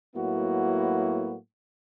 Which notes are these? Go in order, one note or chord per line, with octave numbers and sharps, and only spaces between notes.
A2 F#3 A#3 B3 E4 F#4